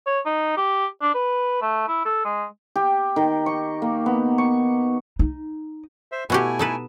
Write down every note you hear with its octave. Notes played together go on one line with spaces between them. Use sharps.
C#5
D#4
G4
D4
B4
A3
E4
A4
G#3
G4
D#3
C#6
A#3
B3
C#6
D#4
C5 E5
B2 A3 E4 F#4 G4 G#5
D#4 A4 B4